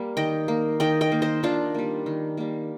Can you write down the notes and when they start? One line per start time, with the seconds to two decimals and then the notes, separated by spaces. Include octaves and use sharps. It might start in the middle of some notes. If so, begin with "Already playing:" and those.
Already playing: G3 A#3
0.17 D#3 D#5 G5
0.48 A#3
0.80 D#3 D#5 G5
1.01 D#5 G5
1.12 A#3
1.22 C5 D#5
1.43 D#3 D4 F4
1.74 G3 A#3
2.06 D#3
2.37 G3 A#3